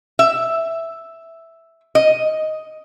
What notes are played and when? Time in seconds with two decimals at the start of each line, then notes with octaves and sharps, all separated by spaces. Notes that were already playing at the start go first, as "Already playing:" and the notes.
0.19 E5
1.95 D#5